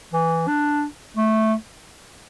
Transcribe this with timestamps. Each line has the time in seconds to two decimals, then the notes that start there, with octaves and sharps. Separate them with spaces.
0.13 E3
0.48 D4
1.17 A3